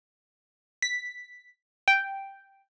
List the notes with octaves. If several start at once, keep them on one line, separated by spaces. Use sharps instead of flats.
B6
G5